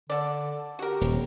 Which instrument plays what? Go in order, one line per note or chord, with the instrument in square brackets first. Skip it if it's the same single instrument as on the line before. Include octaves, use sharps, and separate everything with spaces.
[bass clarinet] D3 [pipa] A4 D5
[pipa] F#4 A#4 [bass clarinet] G4
[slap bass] D#1